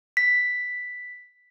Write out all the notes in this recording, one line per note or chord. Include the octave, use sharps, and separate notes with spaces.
B6